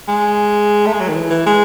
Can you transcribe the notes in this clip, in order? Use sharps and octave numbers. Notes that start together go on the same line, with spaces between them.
G#3
A3
G#3
F#3
D#3
E3
E3
G#3